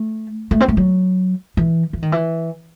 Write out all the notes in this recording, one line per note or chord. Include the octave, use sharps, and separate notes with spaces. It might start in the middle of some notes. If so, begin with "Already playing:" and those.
Already playing: A3
A3
C4
A3
F#3
E3
E3
D#3
E3